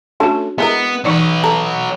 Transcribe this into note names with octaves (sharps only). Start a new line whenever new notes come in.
A3 C#4 D4 F#4 A4
G#3 B3 E4 A#4
E3 F#3 D#4 B4 D5
A4 A#5